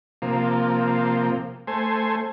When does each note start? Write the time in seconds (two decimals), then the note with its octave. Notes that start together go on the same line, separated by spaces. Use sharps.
0.22 C3 F3 A#3
1.67 A3 C5 G#5